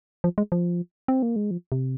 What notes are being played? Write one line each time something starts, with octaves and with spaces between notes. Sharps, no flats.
F3
G#3
F3
C4
A#3
G#3
F3
C3